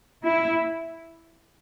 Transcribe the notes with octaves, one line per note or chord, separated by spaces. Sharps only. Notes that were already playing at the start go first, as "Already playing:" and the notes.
E4